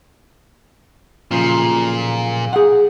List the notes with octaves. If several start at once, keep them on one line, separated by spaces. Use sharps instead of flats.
B1 A#2 C#3 F3
G#4 F#5